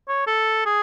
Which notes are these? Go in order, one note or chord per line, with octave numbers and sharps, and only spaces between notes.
C#5
A4
G#4